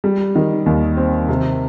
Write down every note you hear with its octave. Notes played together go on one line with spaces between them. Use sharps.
G3
D#3
D#2
C4
C3